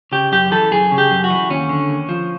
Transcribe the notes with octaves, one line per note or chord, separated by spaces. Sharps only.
C#3 G4
F#2 G4
E3 A4
F#2 G#4
C#3
G4
F#2
F#4
E3
D#2 C#4
D3
D#2
F3